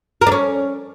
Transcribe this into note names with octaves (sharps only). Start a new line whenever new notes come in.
A#4
D4
C#4